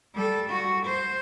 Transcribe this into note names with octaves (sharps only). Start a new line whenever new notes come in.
G3 A4
F#4
C5